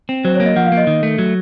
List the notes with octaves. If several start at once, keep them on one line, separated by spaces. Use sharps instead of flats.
C4
F#3 C5
C#5
A#3
D#5
F3 F#5
F5
A#3
D#5
D#3
A3
F#3